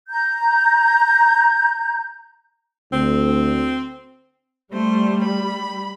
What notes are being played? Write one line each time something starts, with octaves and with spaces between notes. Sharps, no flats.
A#5 G6
D2 C4
G3 A3 C5
B5